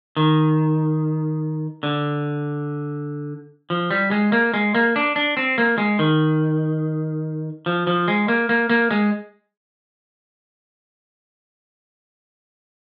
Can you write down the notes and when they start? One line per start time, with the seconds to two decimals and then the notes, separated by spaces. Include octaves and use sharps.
0.17 D#3
1.83 D3
3.70 F3
3.91 G3
4.11 G#3
4.32 A#3
4.54 G#3
4.75 A#3
4.96 D4
5.16 D4
5.37 C4
5.58 A#3
5.78 G#3
5.99 D#3
7.66 F3
7.87 F3
8.08 G#3
8.28 A#3
8.49 A#3
8.70 A#3
8.91 G#3